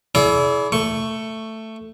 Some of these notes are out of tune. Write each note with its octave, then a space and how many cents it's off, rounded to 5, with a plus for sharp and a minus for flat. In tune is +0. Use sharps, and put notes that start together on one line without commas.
E4 +0 G#4 +40 D5 -35
A3 +10 C#6 +0